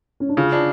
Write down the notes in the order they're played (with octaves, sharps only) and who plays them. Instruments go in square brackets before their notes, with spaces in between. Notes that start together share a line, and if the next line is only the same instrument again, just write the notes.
[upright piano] C#4
D4
[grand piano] C#3 [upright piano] F4
[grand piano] D4